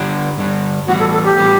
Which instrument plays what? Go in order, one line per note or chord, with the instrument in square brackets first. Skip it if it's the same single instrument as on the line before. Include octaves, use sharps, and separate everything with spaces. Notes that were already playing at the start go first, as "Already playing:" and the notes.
Already playing: [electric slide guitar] G2 D3 G3 D4
G2 D3 G3 D4
[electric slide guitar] A2 E3 G3 B3 [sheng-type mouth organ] F#4
[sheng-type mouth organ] A4
A4
G4
[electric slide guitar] A2 E3 G3 B3